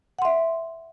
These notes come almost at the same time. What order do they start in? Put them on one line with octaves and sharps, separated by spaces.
F#5 C6 E5